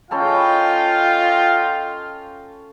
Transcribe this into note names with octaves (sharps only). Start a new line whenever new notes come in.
C#4 F4 A4 D#5 F5 G5 B5